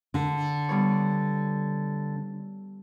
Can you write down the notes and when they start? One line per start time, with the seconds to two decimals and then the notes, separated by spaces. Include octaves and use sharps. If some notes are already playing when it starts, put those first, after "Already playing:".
0.14 D3
0.69 G3 B3 C#5